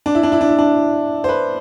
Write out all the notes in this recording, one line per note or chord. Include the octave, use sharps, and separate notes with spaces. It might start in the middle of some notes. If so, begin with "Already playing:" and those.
D4
E4
D4
E4
D4
E4
D4
C5
B4